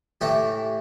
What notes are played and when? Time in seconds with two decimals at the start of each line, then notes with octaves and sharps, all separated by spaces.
0.21 A2 E3 G4